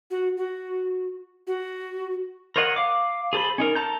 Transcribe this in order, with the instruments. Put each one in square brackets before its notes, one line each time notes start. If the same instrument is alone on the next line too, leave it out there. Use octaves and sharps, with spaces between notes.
[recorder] F#4
F#4
F#4
[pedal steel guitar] A#4 C5 C#5 D#5 F#5
F5 D6
G#4 A4 C5 B5
C#4 D#4 A#4
A4 A5 A#5 G6